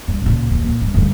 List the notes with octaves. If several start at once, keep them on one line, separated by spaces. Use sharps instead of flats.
G2
C#2 A#2
D#2
A#2
G2
D2 G2